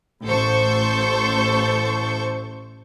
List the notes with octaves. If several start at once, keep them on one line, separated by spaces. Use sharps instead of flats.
A1 A4 C5 C#6 G6